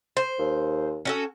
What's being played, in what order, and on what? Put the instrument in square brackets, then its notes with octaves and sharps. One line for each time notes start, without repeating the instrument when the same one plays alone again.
[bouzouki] C5
[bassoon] D#2
[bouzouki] C#4 F#4 A4